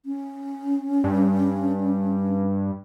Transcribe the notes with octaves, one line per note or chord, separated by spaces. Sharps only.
C#4
G2